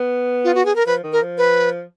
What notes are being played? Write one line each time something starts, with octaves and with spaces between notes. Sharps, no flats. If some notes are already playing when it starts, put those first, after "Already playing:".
Already playing: B3
F4
F#4
G#4
A#4
F3 B4
D#3
A#4
F3
B4